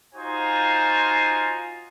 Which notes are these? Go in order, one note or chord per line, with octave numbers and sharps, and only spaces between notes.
D#4 F4 F#4 C5 G#5 A#5